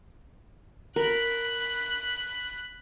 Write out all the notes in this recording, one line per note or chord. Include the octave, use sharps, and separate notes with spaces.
A#4 B5 F#6